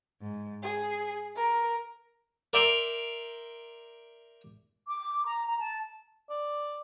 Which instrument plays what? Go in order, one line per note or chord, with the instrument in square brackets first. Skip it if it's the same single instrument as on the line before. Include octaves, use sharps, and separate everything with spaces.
[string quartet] G#2
G#4
A#4
[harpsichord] A#4 D5 E5 G5 A#5 C6
[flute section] D6
A#5
A#5
A5
[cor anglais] D5